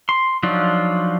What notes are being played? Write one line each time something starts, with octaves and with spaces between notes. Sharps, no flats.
C6
F3 F#3 D4 D#4 F4